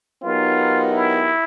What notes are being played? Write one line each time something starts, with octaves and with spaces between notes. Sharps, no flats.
F#3 B3 D#4 F4 G4 A#4
E4